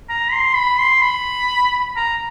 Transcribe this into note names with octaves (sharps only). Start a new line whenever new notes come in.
A#5
C6
B5
C6
B5
A#5